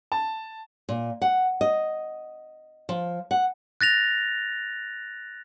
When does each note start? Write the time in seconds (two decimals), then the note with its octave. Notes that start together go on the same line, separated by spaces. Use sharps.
0.12 A5
0.89 A#2
1.22 F#5
1.61 D#5
2.89 F3
3.31 F#5
3.81 F#6 A6 A#6 F7